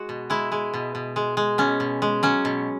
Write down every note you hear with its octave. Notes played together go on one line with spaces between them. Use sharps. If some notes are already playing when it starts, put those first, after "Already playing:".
Already playing: G#3 F#4
B2
G#3 E4
G#3
B2
B2
G#3
G#3
B2 C#4
B2
G#3
F#3 C#4
B2